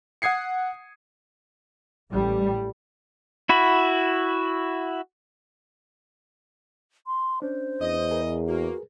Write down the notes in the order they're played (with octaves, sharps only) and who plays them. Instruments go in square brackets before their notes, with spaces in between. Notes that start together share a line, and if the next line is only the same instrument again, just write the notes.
[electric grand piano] F#5 D#6 G#6 C7 C#7
[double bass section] A1 G3
[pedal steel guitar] E4 F#4 B5
[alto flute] C6
[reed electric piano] C#4 D4 [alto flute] C5
[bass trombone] E2 [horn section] D#5
[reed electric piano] G#4 A#4 B4
[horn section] A#3 [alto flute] F#4